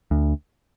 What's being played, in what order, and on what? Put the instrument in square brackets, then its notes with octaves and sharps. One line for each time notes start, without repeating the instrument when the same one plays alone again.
[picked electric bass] D2